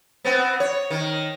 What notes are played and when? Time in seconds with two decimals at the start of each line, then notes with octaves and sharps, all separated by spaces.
0.24 B3 C4
0.60 C#5
0.91 D#3